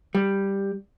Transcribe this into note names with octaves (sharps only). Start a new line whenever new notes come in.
G3